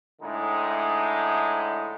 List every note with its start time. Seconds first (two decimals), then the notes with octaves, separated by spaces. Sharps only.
0.21 A2 D3 G#3 D#4